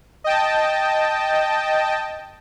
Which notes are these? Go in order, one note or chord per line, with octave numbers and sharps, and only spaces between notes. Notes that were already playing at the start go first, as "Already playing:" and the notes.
D#5 G5 A5